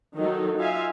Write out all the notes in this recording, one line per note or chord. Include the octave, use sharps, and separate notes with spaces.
D#3 F#3 D#4 A4
D#4 F4 E5 F5 G#5